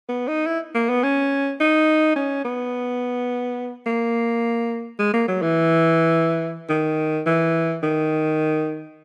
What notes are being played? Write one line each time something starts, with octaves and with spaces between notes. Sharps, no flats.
B3
D#4
E4
A#3
B3
C#4
D#4
C#4
B3
A#3
G#3
A#3
F#3
E3
D#3
E3
D#3